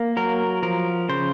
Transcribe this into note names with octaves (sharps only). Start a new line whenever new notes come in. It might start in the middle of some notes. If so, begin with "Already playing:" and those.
Already playing: A#3
F#3 A#4
F3 A#4
C#3 C5